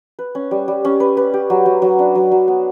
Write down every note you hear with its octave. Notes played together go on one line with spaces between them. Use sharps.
B4
C#4
G3
G3
C#4
B4
B4
G4
F#3
F#3
F#3
D4
F#3
F#3
B3